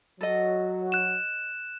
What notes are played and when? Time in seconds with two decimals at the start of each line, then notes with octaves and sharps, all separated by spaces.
0.21 F#3 F#4 A4 D#5
0.92 F#6 E7